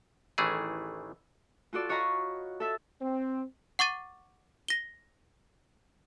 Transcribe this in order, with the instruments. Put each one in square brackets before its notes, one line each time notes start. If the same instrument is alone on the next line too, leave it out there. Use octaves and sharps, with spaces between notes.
[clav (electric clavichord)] A1 D#3 E3 A3 G#4
[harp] F4 F#4 A4 D5
F#4 C#5 D#5 F5 A#5 B5
A4 E5
[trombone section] C4
[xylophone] F#5 C#6 D6 A6 D#7
A#6 G7